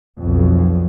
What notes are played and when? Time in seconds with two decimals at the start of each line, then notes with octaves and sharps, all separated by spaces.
0.19 B1 F2